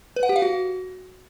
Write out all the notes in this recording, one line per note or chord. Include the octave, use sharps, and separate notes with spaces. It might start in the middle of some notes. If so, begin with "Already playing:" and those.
B4
F#5
G4
F5
F#4